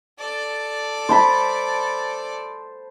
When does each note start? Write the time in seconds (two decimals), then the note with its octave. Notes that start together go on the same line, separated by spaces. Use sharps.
0.19 A4 D5
1.09 C5 A5 B5